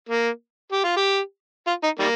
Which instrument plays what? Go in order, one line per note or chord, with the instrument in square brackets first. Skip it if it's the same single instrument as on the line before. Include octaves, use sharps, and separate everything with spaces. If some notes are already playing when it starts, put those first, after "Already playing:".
[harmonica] A#3
G4
F4
G4
F4
D#4
D#3 G3 A#3